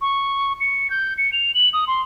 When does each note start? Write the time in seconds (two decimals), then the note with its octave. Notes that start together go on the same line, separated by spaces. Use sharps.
0.01 C#6
0.60 C#7
0.90 G6
1.18 C#7
1.33 F7
1.54 F#7
1.73 D#6
1.88 C6